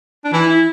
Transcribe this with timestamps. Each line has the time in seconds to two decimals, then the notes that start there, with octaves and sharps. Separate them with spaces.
0.24 D4
0.33 E3 E4
0.50 E4